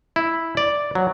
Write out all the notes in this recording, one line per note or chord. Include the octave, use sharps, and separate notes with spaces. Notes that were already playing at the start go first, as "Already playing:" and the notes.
E4
D5
F#3